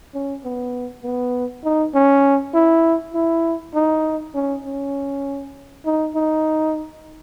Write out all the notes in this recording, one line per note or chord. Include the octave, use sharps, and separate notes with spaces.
C#4
B3
B3
D#4
C#4
E4
E4
D#4
C#4
C#4
D#4
D#4